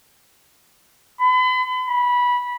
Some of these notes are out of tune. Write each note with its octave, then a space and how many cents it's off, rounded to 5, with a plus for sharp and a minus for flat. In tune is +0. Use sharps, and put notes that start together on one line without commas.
B5 +40
B5 -15